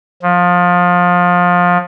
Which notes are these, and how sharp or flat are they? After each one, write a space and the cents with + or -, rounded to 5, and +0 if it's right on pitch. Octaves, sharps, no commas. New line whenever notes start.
F3 +20